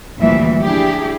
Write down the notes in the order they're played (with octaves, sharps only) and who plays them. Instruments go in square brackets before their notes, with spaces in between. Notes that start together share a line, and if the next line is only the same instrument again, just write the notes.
[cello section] D2 A#2 E3 F3 G3 E5
D4 E4 G4 G#4